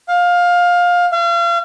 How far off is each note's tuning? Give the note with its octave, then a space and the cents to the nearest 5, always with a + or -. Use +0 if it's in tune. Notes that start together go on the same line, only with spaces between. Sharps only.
F5 +20
F5 -35